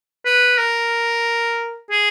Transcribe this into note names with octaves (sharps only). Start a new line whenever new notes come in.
B4
A#4
G#4